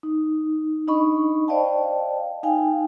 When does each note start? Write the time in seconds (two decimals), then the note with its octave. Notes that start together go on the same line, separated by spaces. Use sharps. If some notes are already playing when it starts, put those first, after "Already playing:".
0.03 D#4
0.87 D4 D#4 D#5 B5 C#6
1.48 C5 D5 D#5 F5 G5 A5
2.43 D#4 F5 G5 G#5